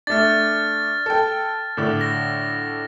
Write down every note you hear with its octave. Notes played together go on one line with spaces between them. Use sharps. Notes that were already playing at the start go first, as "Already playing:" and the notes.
A3 D4 F6 A6
A4 G5
A2 D3
A#6